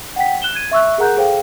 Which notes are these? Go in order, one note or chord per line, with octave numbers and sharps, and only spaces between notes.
F#5 G5 B6
F#6 E7 G7
G#6 D#7
E5 C#6 E6 F#6
G#4 A#4 F#5 A#5 F#6 G6
G#4 A4 C5 F5 G5